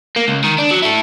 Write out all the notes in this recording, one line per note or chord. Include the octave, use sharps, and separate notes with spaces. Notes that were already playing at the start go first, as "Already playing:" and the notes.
A#3
C#2
D#3
D4
F#3
E4 A4